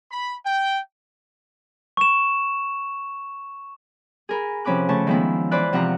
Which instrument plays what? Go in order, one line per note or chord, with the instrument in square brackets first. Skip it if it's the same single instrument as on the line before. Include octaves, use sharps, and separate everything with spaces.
[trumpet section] B5
G5
[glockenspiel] C#6 E7
[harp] G#4 A#4 B5
C3 F3 C#4 B5 D6 F#6
C#3 A3 A5 C#6
D#3 F3 G#3 B3 D#4 E4
E3 B4 C5 D5 B5 F#6
C3 F3 F4 F#5 A#5